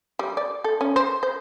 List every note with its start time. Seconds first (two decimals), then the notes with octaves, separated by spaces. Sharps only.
0.19 G3
0.37 D5
0.64 A4
0.81 C#4
0.96 C5
1.23 C5